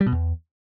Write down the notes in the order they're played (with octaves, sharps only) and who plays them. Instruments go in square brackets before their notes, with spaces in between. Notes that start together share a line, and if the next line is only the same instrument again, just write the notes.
[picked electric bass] G3
B2
E2